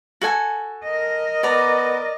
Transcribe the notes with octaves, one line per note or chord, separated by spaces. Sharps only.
F#4 A4 G#5
A#4 D#5
B3 D5 A#5